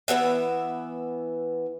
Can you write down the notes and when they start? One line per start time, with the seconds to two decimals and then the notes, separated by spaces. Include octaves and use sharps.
0.08 E3 F#3 B3 E5